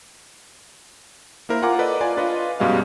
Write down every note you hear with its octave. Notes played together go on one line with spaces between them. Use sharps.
A#3 E4 A#4 C5
F4 F#5 G#5 A#5 D6
A4 B4 D5 D#5
F4 D5 G#5
D4 F4 B4 C#5 D#5
F#2 B2 G3 G#3 F5